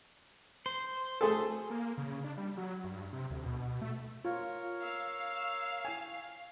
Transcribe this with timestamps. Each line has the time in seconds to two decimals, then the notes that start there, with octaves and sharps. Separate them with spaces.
0.66 C5
1.21 A3 G#4 A4
1.70 A#3
1.98 C#3
2.24 D4
2.37 G3
2.57 F#3
2.84 G2
3.13 C3
3.31 D2
3.46 B2
3.82 A3
4.25 F4 A#4 C#5
4.83 F5 E6
5.85 E4 G5 G#5